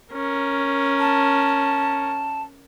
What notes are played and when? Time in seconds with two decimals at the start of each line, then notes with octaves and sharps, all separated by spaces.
0.13 C#4 A#4
0.99 A5